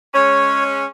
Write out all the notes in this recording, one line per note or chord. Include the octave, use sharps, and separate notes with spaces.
G#3 C#4 C#5